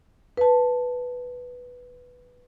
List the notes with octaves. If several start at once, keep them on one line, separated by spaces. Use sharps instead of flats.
B4 A5